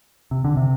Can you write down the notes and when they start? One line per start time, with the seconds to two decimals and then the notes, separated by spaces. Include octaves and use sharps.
0.31 C3
0.44 D3
0.57 C3